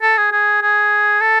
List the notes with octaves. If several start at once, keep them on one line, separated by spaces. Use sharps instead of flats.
A4
G#4
G#4
G#4
A4